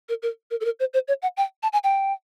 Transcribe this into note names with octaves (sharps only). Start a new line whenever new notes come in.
A#4
A#4
A#4
A4
A#4
C5
C5
C#5
F#5
G5
A5
G#5
G5